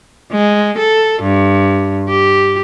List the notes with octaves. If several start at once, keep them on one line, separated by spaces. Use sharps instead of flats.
G#3
A4
G2
G4